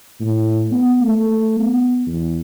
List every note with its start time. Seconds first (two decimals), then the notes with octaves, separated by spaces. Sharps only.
0.20 A2
0.71 B3
1.02 A3
1.59 B3
2.06 E2